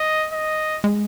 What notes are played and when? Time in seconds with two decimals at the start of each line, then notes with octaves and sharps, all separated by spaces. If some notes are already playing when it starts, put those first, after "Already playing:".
Already playing: D#5
0.33 D#5
0.84 G#3